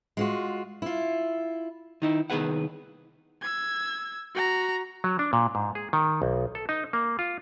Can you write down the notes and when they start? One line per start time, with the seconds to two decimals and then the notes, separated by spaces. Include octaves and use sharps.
0.17 G#3 F4 F#4
0.82 E4 F4
2.02 D#3 D#4 E4
2.30 C2 D#3 B3 G#4 B4 F#5
3.42 E6 G#6
4.34 F#4 A#5
5.04 F#3
5.19 D4
5.33 A#2
5.55 G#2
5.75 G#4
5.93 D#3
6.22 B1
6.55 A4
6.69 D#4
6.93 A#3
7.19 F4